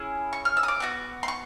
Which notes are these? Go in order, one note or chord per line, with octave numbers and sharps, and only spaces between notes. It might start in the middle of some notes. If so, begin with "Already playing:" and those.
Already playing: C#4 E4 G#4
C#6
F6
E6
D#6
D6
B3 D4 F#4
C6
C#6